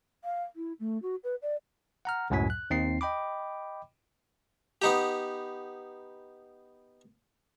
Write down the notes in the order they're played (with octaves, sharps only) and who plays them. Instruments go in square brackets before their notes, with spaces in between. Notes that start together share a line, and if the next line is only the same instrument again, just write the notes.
[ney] F5
E4
A3
F#4
B4
D5
[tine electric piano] F#5 A#5 F6
C#2 F#2 A2 F#3 G#5 B6
F#6
D#2 C4 D#4 C7
D#5 G5 B5 D6
[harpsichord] B3 D#4 G4